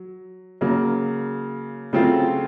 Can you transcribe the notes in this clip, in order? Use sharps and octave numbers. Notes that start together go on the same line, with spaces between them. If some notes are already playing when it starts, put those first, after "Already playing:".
Already playing: F#3
C#3 F#3 A#3
C#3 F#3 A3 C4 F4